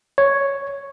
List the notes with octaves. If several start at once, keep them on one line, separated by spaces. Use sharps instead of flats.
C#5